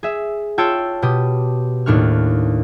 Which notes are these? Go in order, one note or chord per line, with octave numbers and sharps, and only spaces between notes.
G#4 E5
F4 C#5 G5 A5 E6
B2 G4 D#6
D#2 A2 D4 C#6 F6